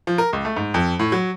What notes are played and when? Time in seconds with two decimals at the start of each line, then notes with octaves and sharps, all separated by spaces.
0.07 F3
0.18 A#4
0.33 C#2
0.45 A3
0.57 G#2
0.74 F2
0.99 A2
1.12 F#3